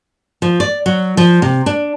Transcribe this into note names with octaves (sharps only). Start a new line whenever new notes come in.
F3
D5
F#3
F3
C3
D4